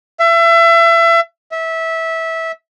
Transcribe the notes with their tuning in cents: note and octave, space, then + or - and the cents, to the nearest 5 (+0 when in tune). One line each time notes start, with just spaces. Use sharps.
E5 +30
E5 -20